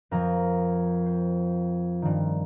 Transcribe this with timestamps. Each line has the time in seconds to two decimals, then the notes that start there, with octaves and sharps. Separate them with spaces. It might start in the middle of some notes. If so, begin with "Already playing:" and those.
0.11 F2 F3 A#4
1.06 C5
2.02 G2 D#3